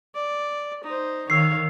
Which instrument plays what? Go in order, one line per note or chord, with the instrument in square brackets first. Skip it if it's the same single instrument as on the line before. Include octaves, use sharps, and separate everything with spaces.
[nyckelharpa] D5
D#4 C5
[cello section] D#3 [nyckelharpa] C#5 F5 [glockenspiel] E6 C7